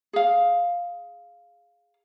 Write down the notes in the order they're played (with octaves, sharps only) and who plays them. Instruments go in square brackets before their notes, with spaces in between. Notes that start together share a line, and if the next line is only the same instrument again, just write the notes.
[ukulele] G#4 F5